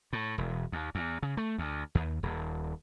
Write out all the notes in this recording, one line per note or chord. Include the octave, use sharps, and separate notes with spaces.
A2
E1
D#2
E2
C#3
A3
D2
D#2
D#1